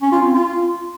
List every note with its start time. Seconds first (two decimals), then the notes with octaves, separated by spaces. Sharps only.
0.02 C#4
0.12 F4
0.23 C4
0.33 F4